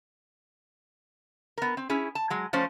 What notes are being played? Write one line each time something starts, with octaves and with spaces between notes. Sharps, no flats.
B3 A#4
C4
C#4 E4 G#4
A5
F#3 G#3
F3 A3 C#4 C5